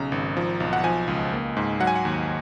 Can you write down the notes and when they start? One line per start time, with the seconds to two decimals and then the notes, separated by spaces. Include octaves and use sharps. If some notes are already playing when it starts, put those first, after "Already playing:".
Already playing: B1 C#3 A#5
0.12 G#1
0.37 F3
0.60 B1
0.73 F#5
0.84 F3 G#5
1.08 C#2
1.33 A#3
1.57 G#2
1.80 F#3 F#5
1.87 G#5
1.96 F#5
2.05 D#2